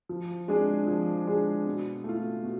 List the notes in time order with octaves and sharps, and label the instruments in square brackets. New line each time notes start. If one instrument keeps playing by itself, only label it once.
[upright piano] F3
G#3 D4 G#4
F3
G#3 D4 G#4
B2
A3 F4
B2